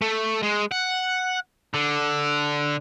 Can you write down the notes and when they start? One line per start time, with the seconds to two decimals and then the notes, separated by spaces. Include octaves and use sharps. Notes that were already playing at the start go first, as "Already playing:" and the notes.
0.02 A3
0.43 G#3
0.71 F#5
1.74 D3